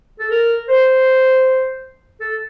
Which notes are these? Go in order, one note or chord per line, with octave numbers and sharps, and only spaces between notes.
A4
A#4
C5
A4